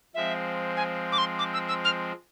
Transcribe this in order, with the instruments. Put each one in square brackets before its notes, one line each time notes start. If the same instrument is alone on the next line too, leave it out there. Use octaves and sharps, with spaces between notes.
[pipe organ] F3 G#3 C4 [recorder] E5
[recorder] G#5
D6
C6
D6
E6
E6
F6